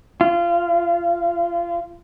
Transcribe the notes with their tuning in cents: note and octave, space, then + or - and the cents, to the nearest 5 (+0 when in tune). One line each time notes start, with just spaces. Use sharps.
F4 -25